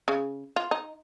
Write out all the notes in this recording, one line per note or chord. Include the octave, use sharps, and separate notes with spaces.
C#3
F4
D#4